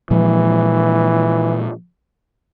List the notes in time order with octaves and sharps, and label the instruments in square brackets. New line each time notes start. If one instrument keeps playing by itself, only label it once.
[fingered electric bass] A#2 F3 G#3 [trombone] E3